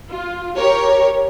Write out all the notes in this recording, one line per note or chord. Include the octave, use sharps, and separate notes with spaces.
F4
G4 A#4 C#5